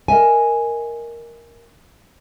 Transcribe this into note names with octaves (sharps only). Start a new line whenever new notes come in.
A#4 D#5 E5 G#5